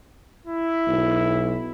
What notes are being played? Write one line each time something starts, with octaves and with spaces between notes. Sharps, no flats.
E4
B1